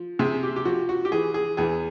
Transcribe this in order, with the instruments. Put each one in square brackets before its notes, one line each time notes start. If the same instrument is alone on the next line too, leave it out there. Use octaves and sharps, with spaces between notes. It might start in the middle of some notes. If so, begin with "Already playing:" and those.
Already playing: [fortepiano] F3
C3 G#4
G4
G4
F3 F#4
F#4
G4
E3 G#4
G#4
E2 G#4